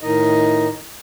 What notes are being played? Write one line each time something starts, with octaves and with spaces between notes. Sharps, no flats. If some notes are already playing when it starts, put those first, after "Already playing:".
A2 D#3 D#4 D#5